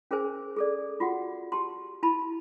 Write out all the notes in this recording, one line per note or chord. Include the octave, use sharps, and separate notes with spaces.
C#4 G#4 A#4 C5 G#5
G#4 A4 D5
F4 F#4 F#5
G4 A5 C6
E4 A5 B5